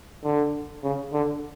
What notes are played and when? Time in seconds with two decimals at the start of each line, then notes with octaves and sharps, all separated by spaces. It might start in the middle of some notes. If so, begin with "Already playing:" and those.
0.24 D3
0.83 C#3
1.13 D3